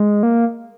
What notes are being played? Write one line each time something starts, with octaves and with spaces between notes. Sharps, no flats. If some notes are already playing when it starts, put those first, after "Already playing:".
Already playing: G#3
A#3